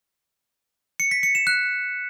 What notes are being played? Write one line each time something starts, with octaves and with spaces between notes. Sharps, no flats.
C#7
B6
C#7
E7
F#6